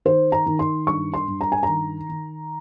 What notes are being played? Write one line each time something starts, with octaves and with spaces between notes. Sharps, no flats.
D#3 C5
A#5
D#3
C6
G2 C#6
C6
G2
A#5
G#5
A#5
D#3
D#3